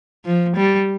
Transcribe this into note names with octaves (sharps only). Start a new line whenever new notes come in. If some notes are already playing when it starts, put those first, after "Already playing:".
F3
G3